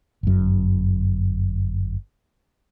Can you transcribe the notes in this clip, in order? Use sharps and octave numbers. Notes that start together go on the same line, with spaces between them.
G1 F#2